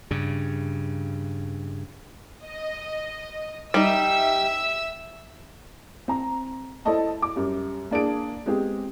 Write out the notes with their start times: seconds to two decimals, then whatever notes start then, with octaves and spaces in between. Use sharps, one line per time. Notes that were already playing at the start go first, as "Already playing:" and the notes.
0.11 G2 C#3
2.44 D#5
3.74 G3 D#4 E5 E6
6.08 C4 A#5
6.85 E4 A4 C5 D5 D#5 A5
7.22 D6
7.36 F#2 G3
7.91 A#3 D4 G#4 D7
8.46 G#3 B3 C4 G4 G#4